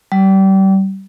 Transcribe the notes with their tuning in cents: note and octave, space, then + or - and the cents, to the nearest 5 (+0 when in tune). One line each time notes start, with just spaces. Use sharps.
G3 -30